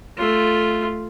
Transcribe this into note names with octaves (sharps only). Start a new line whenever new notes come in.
A3 F4